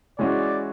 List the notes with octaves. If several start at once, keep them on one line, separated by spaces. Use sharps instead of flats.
E3 G#3 C#4 F#4 D5